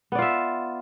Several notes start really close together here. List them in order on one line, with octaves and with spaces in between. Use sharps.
B3 D5 F4 E5